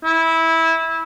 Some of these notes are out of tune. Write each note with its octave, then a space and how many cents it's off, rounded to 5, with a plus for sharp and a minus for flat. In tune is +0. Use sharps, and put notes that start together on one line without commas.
E4 -15